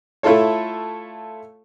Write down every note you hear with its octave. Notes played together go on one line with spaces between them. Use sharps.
A3 E4 F4 A4 C#5